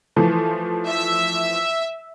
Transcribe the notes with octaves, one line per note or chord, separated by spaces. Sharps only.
E3 F3 A3
E5